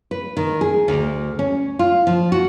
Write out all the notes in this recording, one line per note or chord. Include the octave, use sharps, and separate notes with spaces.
B4
D#3
G#4
D2
C#4
F4
F3
F#4